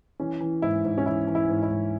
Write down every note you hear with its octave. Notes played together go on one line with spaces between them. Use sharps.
E3 C#4
E3
G#2 E4
G#2
C#4
E3 E4
E3
E4
G#2
E4
G#2